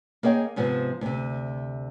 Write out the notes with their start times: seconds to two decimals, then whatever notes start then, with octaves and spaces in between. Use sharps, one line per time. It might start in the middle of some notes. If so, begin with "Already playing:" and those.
0.23 A#3 G#4 C#5 D#5 G5
0.56 G#2 C3 F3 B3
1.01 D2 C3